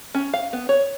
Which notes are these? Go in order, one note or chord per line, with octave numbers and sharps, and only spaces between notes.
C#4
F5
B3
C#5